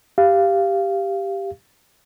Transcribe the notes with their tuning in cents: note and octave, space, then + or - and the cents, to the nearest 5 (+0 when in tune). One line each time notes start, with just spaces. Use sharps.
G4 +0 F5 -15